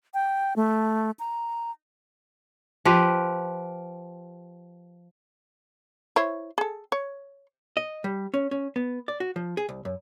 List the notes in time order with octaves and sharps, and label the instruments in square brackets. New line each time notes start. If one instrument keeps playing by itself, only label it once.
[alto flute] G5
A3
A#5
[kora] F3 G4 B4
[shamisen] E4 C5 C#5
G#4 A4
C#5
[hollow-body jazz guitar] D#5
G3
C#4
C#4
B3
D5
F#4
F3
G#4
C2
F#2